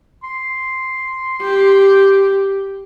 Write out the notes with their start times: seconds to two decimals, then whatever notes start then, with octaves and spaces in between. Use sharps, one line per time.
0.24 C6
1.41 G4